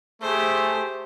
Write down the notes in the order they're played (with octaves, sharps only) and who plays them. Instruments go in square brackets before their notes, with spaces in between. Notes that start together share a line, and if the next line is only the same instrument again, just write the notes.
[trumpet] A3 [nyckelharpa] G4 C5 [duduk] G#4